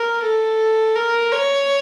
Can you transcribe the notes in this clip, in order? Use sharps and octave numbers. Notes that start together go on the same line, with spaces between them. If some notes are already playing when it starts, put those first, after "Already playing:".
Already playing: A#4
A4
A#4
C#5